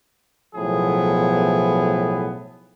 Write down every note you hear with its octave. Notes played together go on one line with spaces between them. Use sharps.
B1 A2 F3 B3 E4 G#4